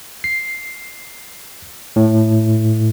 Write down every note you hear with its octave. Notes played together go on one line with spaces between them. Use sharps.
C7
A2